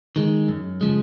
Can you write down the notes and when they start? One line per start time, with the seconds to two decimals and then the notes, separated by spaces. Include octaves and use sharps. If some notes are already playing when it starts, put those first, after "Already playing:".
0.16 D#3 G#3
0.48 F#2
0.81 C#3 F3 G#3